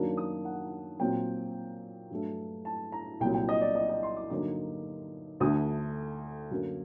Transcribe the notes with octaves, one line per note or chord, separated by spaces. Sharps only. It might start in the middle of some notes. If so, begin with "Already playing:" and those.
Already playing: F#2 D#3 F#3 A#3 D4
D#6
F#5
A#2 F#3 C4 G5
G2 F#3 A3
A5
A#5
C2 A#2 F#3 G5
G5
D#5
D5
D#5
D#5
C6
D6
G2 D3 F#3 A#3 D#4 D6
D2 D3 A3 D#6
F#2 D3 F#3 A#3